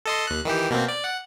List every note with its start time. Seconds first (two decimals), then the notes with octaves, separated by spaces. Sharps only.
0.06 A4 D#5 C6
0.27 D#2 F#6
0.45 D#3 E3 G4
0.70 B2 A#3 C4
0.88 D5
1.04 F#5